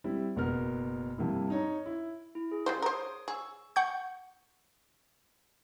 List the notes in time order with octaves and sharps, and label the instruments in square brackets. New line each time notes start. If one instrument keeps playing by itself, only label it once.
[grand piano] G3 C4 E4
F#1 B2 B3 A#4 F6
G2 C3 A#3 E4
D#4 C#5 A#5
E4
[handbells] E4
G#4
[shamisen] C#3 G3 C5
[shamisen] A#4 C5 [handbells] C#5 D6 D#6
[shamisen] G#4 [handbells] C#6 E6
[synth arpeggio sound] F#5 C#6 G6